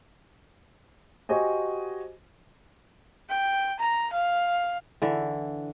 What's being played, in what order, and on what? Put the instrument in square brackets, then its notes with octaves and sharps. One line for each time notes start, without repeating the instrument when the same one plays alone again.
[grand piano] F#4 G4 C5 D#5 G#5
[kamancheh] G5
A#5
F5
[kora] D3 E3